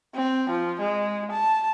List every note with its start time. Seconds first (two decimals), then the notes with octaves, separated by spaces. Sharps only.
0.15 C4
0.50 F3
0.81 G#3
1.31 A5